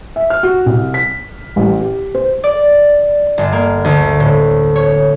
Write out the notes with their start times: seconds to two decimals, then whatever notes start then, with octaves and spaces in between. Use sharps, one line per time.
0.16 E5
0.30 F6
0.43 F#4
0.66 C2
0.94 B6
1.56 A1
1.81 G4
2.15 C5
2.44 D5
3.38 G1
3.52 A#3
3.85 D2
4.20 A2
4.76 C#5